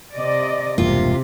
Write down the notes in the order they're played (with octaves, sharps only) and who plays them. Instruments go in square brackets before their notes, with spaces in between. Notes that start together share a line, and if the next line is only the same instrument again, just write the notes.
[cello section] C3 D5 D#5
[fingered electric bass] E1 G2 A#3 [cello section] C3 [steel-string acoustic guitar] F4